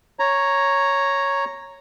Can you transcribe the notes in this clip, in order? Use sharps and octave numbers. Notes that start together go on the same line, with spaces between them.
C#5 A#5